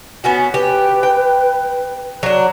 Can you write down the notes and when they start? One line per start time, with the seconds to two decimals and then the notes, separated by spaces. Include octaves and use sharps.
0.24 B3 C#4 F#4 G#5
0.54 G4 B4
1.03 G5
2.23 F#3 D4